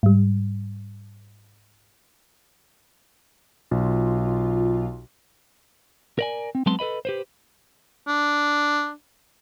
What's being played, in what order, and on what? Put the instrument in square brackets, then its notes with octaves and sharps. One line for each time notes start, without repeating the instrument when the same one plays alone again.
[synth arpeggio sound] G#2 G3
[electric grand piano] B1 [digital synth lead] F4
[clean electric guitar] A#4 D5 G#5
C4
F#3 G#3 B3 C4 A5 C6
A4 B4 D#5 B5
G4 B4 C5
[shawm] D4